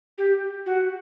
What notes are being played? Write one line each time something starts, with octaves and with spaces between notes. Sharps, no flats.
G4
F#4